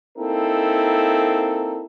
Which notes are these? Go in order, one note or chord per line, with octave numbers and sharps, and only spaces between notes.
A#3 C4 D#4 E4 A4 A#4